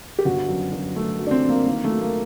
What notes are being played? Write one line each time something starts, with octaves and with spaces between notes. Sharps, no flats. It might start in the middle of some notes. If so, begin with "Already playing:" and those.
G4
G1 F#4
F#2
F#2
F#3 A3
F#3
D4
C4
F#3
A#3
D#3 A#3
A3
F#3
A#3